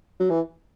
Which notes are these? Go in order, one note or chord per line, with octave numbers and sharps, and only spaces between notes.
F#3
E3